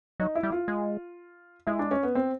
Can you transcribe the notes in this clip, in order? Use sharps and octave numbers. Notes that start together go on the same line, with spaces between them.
F#3 D#4
E4
G3
F4
G#3
G#3 E4
D4
C#4
B3
C4